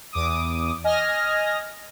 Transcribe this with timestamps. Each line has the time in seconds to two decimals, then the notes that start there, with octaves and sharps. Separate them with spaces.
0.12 E2 D6 D#6
0.84 D#5 G#5 F6 A#6